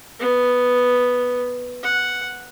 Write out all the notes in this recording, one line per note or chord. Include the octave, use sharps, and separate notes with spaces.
B3
F#5